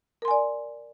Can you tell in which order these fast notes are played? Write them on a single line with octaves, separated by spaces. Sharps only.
A#4 C6 G#5 D5